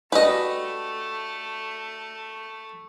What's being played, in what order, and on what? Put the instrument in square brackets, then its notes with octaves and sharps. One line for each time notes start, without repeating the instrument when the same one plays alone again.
[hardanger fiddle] A3 [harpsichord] D4 F#4 G4 [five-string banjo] B4 D#5